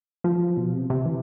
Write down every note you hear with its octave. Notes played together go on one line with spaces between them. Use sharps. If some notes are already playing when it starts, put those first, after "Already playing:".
F3
B2
C3
C3
E3